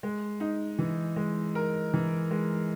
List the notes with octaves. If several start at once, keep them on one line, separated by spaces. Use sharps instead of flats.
G#3
D#4
E3
G#3
A#4
E3
G#3